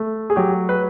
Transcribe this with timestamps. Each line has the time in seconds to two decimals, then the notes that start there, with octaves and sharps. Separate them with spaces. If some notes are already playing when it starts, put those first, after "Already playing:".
Already playing: A3
0.30 G#4
0.36 F#3 G4
0.69 B4